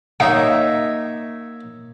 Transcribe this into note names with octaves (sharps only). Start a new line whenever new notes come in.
A#3 D#4 C#5 E5 F5